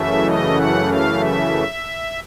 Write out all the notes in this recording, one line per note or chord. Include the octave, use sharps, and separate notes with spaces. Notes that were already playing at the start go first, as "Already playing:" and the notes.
Already playing: F#2 C#3 E3 A3 E5
D#5
F#5
F5
E5